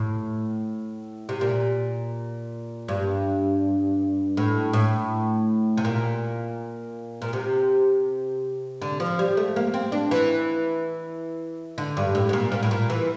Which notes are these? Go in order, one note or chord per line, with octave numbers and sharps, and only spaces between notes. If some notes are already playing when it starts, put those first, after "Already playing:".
Already playing: A2
C3
A#2
G2
A2
A2
C3
A#2
A#2
C3
D3
F3
G3
A3
A#3
C4
D4
E3
D3
G2
A2
A2
A#2
A#2
A2
A#2
E3